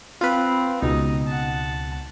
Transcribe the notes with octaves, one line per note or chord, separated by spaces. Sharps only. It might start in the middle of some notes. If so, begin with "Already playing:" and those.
C4 F4 B4
C#2 B2 D#4 D#5
F#5 A5